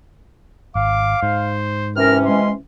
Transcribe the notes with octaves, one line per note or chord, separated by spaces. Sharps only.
G#1 F5 D6
G#2 C5
C3 E3 C#4 A#4 F6
G#3 C6